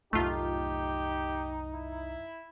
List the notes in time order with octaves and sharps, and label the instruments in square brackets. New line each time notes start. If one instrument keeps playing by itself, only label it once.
[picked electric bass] C2 F#2 A2 [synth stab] A3 F4 [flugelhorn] D#4 [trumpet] G4
[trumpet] E4